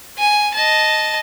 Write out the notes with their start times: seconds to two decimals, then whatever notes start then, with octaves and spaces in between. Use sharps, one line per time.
0.19 G#5
0.54 D#5 A5